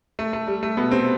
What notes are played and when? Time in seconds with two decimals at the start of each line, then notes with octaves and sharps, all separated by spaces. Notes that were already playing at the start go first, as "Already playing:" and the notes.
0.19 A3
0.33 A3
0.47 G3
0.63 A3
0.77 B2 B3
0.91 C3 C4